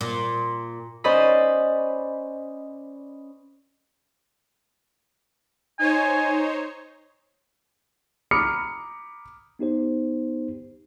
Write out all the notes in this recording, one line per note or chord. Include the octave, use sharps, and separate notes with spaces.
A#2
C#4 C5 D5 D#5 B5
D#4 C5 C#5 G#5
A#5 B5 D6 D#6 F6 C#7
B3 D#4 G4 C5